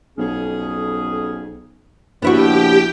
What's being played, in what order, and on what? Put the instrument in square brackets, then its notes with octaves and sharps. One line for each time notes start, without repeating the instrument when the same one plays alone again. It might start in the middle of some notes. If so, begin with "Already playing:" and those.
[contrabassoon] B1 [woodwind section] F2 C#4 G#4
[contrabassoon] A#1 [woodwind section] C#3 F3 [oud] B3 E4 F#4 [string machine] G4 G5